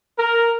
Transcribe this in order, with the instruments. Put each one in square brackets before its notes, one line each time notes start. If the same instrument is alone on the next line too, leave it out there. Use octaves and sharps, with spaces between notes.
[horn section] A#4